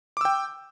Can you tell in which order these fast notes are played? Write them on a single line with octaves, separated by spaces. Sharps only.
D6 E6 G5